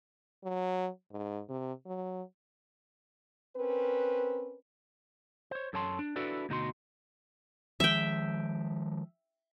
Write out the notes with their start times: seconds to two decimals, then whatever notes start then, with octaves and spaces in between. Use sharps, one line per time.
0.44 F#3
1.12 G#2
1.49 C3
1.86 F#3
3.56 C4 C#4 A#4 B4
5.51 C5 C#5
5.73 F#2 A4 C#5 A5 C6
5.99 D4
6.16 D4 E4 F#4 A4 B4 D5
6.49 D2 B2 D#4 F#4 C6
7.80 D#3 F3 G#3 E5 G5